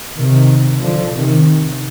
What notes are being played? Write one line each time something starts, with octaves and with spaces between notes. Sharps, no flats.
C3 D#3
D3 F3
C3 D#3